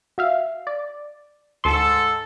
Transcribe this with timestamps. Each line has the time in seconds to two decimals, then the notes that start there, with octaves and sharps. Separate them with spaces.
0.18 F#4 E5 F5
0.67 D5
1.64 D2 G#2 A4 C6